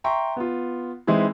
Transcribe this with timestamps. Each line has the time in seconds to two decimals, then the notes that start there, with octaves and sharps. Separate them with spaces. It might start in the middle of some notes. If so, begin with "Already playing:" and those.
0.04 E5 G5 A#5 C6 C#6
0.36 B3 F4
1.07 E3 G#3 C4 D#4 E4